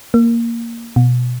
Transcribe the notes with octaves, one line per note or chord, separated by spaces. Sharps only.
A#3
B2